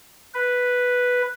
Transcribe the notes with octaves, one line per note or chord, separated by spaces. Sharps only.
B4